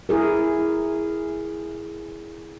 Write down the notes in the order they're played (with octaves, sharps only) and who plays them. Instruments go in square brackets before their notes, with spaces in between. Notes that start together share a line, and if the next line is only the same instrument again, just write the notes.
[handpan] E4 G#4 A#4